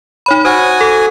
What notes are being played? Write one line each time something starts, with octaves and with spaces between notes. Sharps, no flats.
D#4 C#5 B5
F#4 C5 G#5 D#6
A4